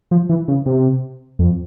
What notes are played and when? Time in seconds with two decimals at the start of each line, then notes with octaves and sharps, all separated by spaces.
0.11 F3
0.29 E3
0.48 C#3
0.66 C3
1.39 F2